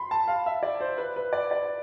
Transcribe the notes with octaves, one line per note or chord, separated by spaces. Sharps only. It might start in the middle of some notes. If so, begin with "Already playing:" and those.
Already playing: B5 C6
A5
F5
E5
D5
C5
B4
B4
D5
D5